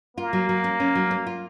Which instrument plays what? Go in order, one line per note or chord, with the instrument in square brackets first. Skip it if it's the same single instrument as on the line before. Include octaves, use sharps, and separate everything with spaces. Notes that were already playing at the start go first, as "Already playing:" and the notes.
[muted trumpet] A#3 [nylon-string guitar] F4
[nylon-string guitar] F#3
F#3
C#4
C#4
F#3
C#4
F4